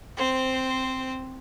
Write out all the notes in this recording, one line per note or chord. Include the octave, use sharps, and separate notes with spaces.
C4 C5